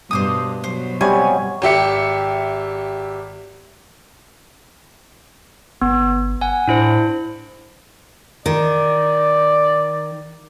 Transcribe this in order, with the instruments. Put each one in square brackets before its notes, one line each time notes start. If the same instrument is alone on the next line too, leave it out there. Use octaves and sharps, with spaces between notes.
[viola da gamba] G2 B2 [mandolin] C5 D6 D#6
[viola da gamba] B2 F#3 [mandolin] C5
[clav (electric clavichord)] C3 G3 [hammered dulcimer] F#4 C#5 D#5 [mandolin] G#5
[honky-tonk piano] G#1 G4 E5 C#7
[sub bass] G1 [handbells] B3
[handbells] F#5 G#5
[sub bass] A2 [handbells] D4 E4 C5
[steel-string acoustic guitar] D#3 [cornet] D5